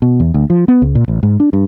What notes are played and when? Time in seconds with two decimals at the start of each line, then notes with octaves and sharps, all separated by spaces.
0.02 B2
0.20 E2
0.34 D2
0.50 F3
0.68 B3
0.82 C#2
0.95 A#2
1.08 A1
1.23 G#2
1.40 D4
1.53 G2